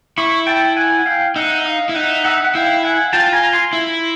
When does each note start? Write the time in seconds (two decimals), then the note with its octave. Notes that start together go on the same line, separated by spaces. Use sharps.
0.17 E4 B5 C#6
0.47 G5 A5
0.77 F#5 G#5
1.06 F5 G5
1.35 D#4 E5 F#5
1.65 D#5 F5
1.89 E4
1.95 D#4 E5 F#5
2.24 E5 F#5
2.44 F#5
2.55 E4 F5 G5
2.83 F#5 G#5
3.13 F4 G5 A5
3.33 G#5 A#5
3.53 A#5 C6
3.73 E4